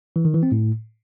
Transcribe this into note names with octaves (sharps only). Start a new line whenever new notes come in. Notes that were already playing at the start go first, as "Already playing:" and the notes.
E3
D#3
E3
C4
A2